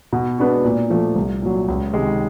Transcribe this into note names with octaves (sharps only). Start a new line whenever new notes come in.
B2
G#3 B3 D4 F#4
A#2
F3 A3
C2
A#2 F#3
C#2
C3 D#3 G#3